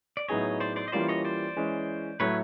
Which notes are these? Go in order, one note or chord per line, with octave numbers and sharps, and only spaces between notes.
D5
A2 F#3 B3 D#4 G#4 C#5 D#5
C5 D5
C5 D5
D#5
E3 G3 A#3 C#4 F4 C5 D5
C#5 D#5
C5 D5
E3 G#3 C#4
A2 F#3 A3 B4 C#5